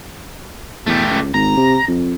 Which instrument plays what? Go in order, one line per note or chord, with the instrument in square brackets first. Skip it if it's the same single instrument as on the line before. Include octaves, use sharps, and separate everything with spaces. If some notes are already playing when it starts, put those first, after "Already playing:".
[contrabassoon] E2 [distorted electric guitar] A3 G4
[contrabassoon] C#2
[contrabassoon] G#1 [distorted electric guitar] A#5
[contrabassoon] C3
F2